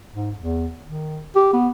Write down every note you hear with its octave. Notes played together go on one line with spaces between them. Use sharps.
G#2
E2
D#3
G4
B3